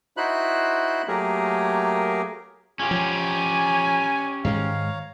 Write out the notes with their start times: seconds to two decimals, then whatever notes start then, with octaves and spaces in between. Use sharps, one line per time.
0.17 D#4 E4 F#4 C5 B5 F#6
1.08 F#3 A3 A#3 G4 G#4 A#4
2.79 C#4 F4 G4 G#4
2.91 F3 C#5 G#5
4.45 G#2 D#3 G#3 C#5 F5 A#5